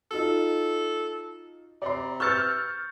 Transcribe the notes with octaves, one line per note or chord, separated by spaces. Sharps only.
D#4 F4 F#4 A4
C3 D5 A#5 C6
B4 C#6 E6 F6 G6 A6 C#7